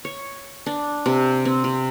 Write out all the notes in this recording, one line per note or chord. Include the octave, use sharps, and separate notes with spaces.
C#5
D4
C3
C4
C3